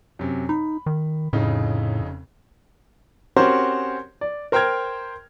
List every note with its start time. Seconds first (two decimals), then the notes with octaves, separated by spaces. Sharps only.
0.19 F#2 C3
0.49 D#4 B5
0.86 D#3
1.33 F1 A2 C#3 D#4
3.36 C4 C#4 F#4 G4 A#4 C5
4.21 D5
4.52 A#4 C5 G5 A#5 F6 G#6